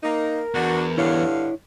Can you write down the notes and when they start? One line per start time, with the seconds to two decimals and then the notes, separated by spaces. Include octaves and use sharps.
0.03 A#3 D#4 A#4
0.54 E2 D4 F#4
0.98 G2 D3 E4 C#5 F5